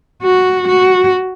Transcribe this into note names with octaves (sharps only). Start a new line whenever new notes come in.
F#4
F#4